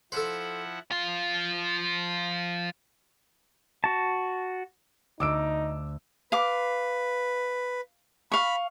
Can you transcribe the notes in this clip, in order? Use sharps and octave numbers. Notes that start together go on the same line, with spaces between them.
F3 E4 A4 C5 F#5
F3 F4
F#4 A5
D2 D#4 D6 E6 D7
B4 F5 D6
F5 B5 C#6